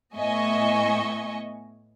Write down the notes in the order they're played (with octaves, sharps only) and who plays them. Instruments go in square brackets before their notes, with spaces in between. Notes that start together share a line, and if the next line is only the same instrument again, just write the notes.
[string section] A2 B3 D#5 E5 G#5 C#6